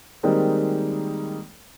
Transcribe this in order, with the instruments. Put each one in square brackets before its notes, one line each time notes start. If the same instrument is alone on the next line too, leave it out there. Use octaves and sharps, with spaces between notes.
[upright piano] D#3 G3 G#3 A#3 C4